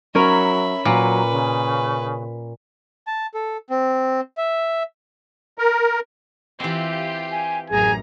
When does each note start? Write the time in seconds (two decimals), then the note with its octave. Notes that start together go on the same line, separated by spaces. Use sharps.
0.15 F#3 C#4 A#4 C#5 E5 B5
0.85 A#2 F#3 B4
1.32 C#3
3.07 A5
3.35 A4
3.70 C4
4.38 E5
5.58 A#4
6.60 E3 C4 F4 G4
7.31 G#5
7.70 A1 F#2 G#4 G#5 A#5